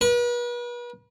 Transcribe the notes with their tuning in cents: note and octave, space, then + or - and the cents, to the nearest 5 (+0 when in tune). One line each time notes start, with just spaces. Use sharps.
B4 -40